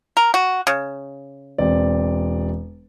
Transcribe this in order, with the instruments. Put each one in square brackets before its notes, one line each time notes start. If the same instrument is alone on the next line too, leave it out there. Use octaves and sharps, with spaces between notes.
[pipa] A#4
F#4
C#3
[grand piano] E1 C4 D5